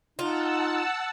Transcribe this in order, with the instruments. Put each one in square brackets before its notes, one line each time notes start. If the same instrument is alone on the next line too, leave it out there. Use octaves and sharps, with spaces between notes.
[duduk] D#4 [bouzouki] F4 [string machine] F#5 A5 E6